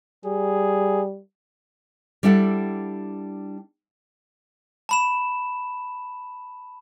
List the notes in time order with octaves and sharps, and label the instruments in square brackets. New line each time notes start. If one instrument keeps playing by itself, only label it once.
[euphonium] G3 [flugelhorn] G#4
[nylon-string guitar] G3 D4 E4 A4 F#5
[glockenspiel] A5 B5 E7